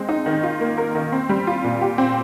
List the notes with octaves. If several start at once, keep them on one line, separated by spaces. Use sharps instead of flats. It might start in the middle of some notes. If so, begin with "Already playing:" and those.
Already playing: G#3 C4
D#4
D#3
F4
A#3
A#4
D#3
C4
G3
F4
A#2
G4
C4